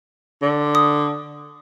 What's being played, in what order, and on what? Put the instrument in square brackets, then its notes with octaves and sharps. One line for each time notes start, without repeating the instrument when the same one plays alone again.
[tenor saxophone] D3
[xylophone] D#6